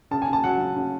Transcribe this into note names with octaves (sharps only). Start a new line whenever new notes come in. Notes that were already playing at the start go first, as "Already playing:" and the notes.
C#3 A5
G#5
C#3 A5
F#3 F#5
C#3
C#3